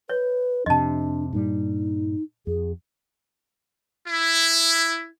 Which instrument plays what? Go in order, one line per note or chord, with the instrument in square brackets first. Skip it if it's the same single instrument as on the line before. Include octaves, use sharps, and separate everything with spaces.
[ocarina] B4 [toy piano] C#5
[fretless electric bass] F2 C3 [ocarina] D4 [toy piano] D#5 A5
[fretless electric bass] G2 A#2 G3 [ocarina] D#4
[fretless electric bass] F2 [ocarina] G#4
[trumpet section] E4